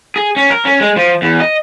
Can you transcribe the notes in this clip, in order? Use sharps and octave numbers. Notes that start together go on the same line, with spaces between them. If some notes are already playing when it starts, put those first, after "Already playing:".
G#4
C#4
A#4
C#4
G#3
F3
E2
D#5